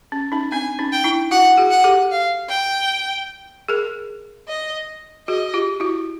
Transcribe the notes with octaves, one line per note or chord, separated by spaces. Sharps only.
C#4
C#4 D#4
C4 D4 G#5
C#4 D#4
G5
D4 E4
E4 F#4 F#5
F#4 G#4
F#5
G4 A4
F5
G5
G#4 A#4
D#5
F#4 G#4 D#5
F4 G4
E4 F#4